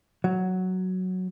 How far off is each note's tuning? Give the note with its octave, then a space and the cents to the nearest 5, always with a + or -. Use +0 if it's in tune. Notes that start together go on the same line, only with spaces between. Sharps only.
F#3 +0